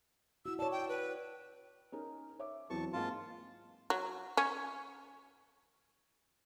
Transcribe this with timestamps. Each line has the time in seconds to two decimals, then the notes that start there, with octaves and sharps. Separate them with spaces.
0.46 E4 F#4 E6
0.59 C#5 D5 A5
0.72 G5
0.89 B4
1.92 C#4 D#4 A#4
2.39 C#5 E5 D6
2.70 E2 E3 F#3 C4 A5 C#6
2.93 G#2 A#3 C4 F4 A5
3.90 F#3
4.37 C#4